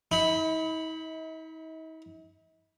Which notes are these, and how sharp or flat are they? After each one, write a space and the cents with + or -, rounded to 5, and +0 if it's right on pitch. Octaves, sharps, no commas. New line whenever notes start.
D#4 +45 B5 +0